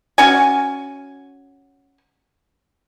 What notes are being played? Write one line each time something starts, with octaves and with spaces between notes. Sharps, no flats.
C#4 F#4 G#5